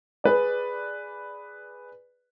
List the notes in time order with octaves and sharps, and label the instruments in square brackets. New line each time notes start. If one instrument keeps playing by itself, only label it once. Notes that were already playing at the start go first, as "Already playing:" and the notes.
[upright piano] G#4 B4 D5